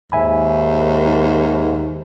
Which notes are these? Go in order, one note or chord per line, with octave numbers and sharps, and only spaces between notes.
D#2 G#2 E5 G#5 B5